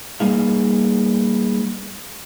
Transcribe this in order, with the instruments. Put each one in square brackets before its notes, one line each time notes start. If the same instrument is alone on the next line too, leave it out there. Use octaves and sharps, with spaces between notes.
[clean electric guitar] G3 A#3 B3 D#4 G#4 F5